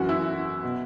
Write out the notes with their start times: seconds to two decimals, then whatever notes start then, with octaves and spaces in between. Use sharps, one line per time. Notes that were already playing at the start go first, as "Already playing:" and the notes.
Already playing: F#2 E3 F#4
0.09 E4
0.64 B2